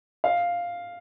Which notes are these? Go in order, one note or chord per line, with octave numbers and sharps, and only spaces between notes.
F5